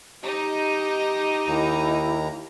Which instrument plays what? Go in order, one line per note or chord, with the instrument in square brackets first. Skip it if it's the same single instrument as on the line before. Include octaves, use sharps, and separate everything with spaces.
[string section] D#4 [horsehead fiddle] G4
[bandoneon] D#2 A#5 [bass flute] E4